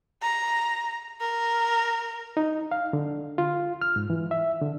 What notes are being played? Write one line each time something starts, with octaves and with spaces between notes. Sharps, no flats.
A#5
A#4
D#4
F5
D3
F4
F6
G#2
E3
E5
D3